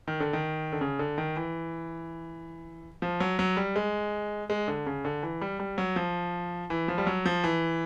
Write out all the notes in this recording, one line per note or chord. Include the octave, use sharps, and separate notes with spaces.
D#3
D3
D#3
D3
C#3
D3
D#3
E3
F3
F#3
F#3
G3
G#3
G#3
D3
C#3
D3
E3
G3
G3
F#3
F3
E3
F3
G3
F#3
F3
E3